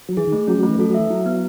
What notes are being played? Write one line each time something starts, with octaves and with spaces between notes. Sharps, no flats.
F#3
E3 G#4
D#3
A3
F#3 C#4
F#3
A3
E3
F#3 A4
F#3
E3 E5
F#3 E4
B3